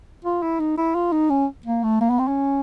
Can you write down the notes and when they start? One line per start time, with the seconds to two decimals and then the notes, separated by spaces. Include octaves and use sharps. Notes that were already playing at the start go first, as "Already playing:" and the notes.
0.24 F4
0.42 E4
0.60 D#4
0.77 E4
0.95 F4
1.12 D#4
1.30 C#4
1.65 A#3
1.83 A3
2.01 A#3
2.10 B3
2.19 C4
2.28 C#4